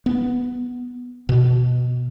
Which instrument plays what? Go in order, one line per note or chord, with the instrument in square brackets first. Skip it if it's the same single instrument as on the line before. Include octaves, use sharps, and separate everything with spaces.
[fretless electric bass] B3
B2